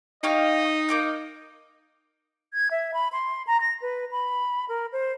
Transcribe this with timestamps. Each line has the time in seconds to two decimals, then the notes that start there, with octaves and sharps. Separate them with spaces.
0.23 D#4 G4 C#5 D#5 F5
0.89 A#3 D6 G6
2.53 G#6
2.71 E5
2.94 B5
3.12 C6
3.47 A#5
3.61 A#6
3.82 B4
4.11 B5
4.69 A#4
4.93 C5